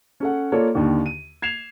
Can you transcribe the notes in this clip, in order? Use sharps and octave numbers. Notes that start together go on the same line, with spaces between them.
C#4 A4 F#5
A#3 F4 A4 C#5 D5
D#2 D3 D#3
D#7
G#6 C7 E7 F7